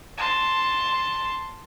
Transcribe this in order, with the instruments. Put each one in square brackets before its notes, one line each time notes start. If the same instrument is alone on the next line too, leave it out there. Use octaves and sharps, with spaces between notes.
[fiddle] A5 C6